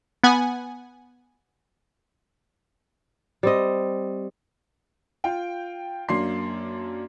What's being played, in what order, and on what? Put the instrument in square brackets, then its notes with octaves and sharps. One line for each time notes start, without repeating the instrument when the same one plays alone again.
[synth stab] B3 F#5 G#5
[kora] G3 C4 D#5
[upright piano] F4 G5
F#2 A#3 D4 C6 C7